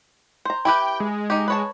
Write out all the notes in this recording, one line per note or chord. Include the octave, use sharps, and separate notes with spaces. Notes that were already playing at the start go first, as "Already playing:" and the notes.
C5 A#5
E4 G4 B4 G5
G#3
D#4 G4
B4 C#5 A5